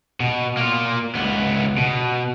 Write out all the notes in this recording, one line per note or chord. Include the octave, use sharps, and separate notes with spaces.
B2
A#3 F4
C#2 B3
B2